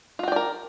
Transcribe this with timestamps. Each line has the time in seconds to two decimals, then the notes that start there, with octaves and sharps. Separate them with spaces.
0.19 F4
0.23 F#4
0.28 G5
0.32 D5
0.36 A#4